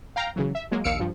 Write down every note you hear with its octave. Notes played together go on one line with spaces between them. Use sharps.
F5 G5 A#5
C#3 E3 F#3
E5
F#3 G#3 A#3
A#1 D#2 F5 E6 C#7 D7
G2 F3